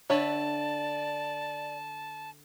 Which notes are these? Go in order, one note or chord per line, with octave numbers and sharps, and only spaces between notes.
D3 B4 C#5 D5 E5 A5